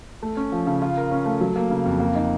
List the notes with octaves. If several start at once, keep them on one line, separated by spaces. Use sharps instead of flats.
A3
C#4
F3
C#3
F4
A#4
C#4
A3
F#3
A#3
C#3
F2
A#3
D#4